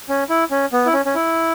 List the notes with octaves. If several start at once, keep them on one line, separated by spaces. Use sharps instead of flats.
C#4
E4
C#4
B3
E4
C#4
C#4
E4